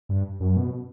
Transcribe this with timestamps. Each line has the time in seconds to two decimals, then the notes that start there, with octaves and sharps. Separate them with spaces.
0.09 G2
0.40 F#2
0.56 B2